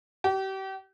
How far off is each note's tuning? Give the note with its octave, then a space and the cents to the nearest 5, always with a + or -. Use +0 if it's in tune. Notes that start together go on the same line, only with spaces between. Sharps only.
G4 -35